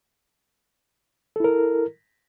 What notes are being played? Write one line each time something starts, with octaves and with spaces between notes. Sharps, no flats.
E4 A4 A#4